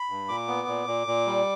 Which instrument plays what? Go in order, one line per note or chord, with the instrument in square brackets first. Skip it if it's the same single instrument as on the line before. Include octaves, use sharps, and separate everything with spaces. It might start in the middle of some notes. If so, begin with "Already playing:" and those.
Already playing: [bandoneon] B5
G2
A#2 D6
B3
A#2
A#2
A#2
G3